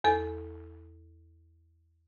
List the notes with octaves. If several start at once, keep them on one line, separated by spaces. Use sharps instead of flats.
E2 A4